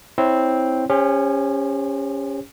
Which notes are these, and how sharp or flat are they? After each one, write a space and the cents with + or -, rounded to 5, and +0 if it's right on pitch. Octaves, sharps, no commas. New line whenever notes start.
C4 +0 E4 -20 C#5 +0
C#4 +0 G4 +45 C5 +25